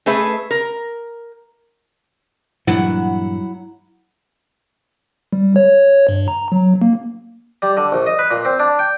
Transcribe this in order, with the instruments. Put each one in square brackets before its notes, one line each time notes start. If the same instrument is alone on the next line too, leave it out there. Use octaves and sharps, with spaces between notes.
[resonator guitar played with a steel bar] A3 G#4 A4 B4 E5
A#4
[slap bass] G2 A#2 E3 [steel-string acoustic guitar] F#3 E4 F#5
[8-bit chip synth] G3
C#5
G2
A#5
F#3
A#3
[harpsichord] G3
D3
A#1
D#5
B4
A#2
C4
D4
G5